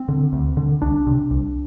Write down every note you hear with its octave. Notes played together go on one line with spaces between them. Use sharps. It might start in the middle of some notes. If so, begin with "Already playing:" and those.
Already playing: C4
D3
D2
D3
C2 D4
C3
C2